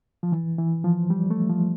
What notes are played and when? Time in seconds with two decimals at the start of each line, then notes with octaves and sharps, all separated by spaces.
0.23 F3
0.32 E3
0.58 E3
0.84 F3
1.10 G3
1.30 A3
1.50 F3